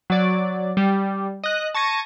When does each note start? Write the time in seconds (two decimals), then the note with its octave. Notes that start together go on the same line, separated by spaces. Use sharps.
0.10 F#3 D5
0.77 G3
1.44 D#5 F#6
1.75 A5 C#6 G#6 A#6 D#7